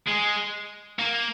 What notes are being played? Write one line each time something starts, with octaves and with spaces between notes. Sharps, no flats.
G#3
A#3